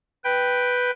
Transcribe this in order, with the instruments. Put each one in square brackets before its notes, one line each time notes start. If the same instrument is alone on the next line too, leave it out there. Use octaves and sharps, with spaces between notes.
[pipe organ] B4 G5